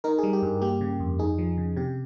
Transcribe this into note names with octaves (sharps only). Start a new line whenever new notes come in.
D#4 A#4
G3 G#4
G4
G2
A#3 G4
C#3
F2
D#4 G#4
F3
C#3
C3 G4